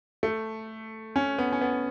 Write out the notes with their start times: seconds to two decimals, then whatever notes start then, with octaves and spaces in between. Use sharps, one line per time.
0.23 A3
1.16 C#4
1.38 B3
1.52 C#4
1.61 B3